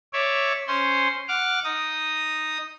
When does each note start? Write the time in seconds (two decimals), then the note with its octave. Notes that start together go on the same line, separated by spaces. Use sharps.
0.13 C#5 D5 E5
0.67 C#4 C5 C6
1.28 F#5 D6 F6
1.64 D#4 D#6